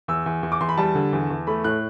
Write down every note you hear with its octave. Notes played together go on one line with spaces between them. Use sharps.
E2 E6
E2
E2
D6
E2 C6
B5
G3 A5
D3
E2
E2
A3 B5
A2 F#6